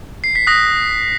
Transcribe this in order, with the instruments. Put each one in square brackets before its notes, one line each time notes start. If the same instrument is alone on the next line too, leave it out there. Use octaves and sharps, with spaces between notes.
[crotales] C7
B6
D#6 F#6 A#6